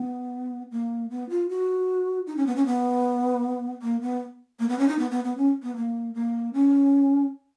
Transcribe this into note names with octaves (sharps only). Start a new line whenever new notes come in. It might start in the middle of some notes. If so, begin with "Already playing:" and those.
Already playing: B3
A#3
B3
F4
F#4
D#4
C#4
B3
C#4
B3
A#3
B3
A#3
B3
C#4
D#4
B3
B3
B3
C#4
B3
A#3
A#3
C#4